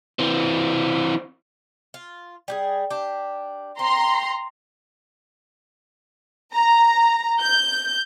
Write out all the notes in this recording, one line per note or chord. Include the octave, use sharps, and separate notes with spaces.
E3 C4
F4
G3 G4 G#4
D4 G4
C4 A#5 C6
A#5
G6